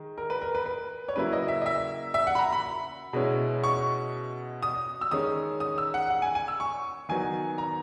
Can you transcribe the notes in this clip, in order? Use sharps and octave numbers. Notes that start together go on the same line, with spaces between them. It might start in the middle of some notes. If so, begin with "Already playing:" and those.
Already playing: D#3 G#3
A#4
B4
A#4
B4
B4
C#5
C#3 F#3 A#3 E4 B4
D#5
E5
D#5
E5
E5
F#5
B5
A#5
B5
B2 G#3 C#4 E4
C#6
D#6
E6
D#3 G#3 C#4 D#6
D#6
E6
F#5
F#5
G#5
G#5
E6
C#6
D#3 F#3 B3 G#5
A#5